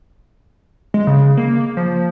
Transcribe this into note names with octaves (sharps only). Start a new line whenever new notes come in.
G#3
C#3
A#3
F3